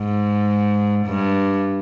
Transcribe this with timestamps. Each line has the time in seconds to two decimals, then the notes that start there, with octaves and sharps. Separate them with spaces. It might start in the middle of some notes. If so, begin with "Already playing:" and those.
Already playing: G#2
1.07 G2